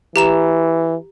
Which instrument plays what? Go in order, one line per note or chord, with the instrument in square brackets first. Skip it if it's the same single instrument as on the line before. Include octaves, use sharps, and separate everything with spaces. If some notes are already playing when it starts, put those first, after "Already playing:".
[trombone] E3 [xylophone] G4 A#5 E7